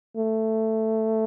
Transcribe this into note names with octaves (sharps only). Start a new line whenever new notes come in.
A3